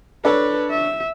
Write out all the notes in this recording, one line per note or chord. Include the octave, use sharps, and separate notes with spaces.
D4 A4 B4 C#5
E5